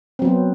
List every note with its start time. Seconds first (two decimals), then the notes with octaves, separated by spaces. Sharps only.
0.19 C4
0.22 F#3
0.25 B3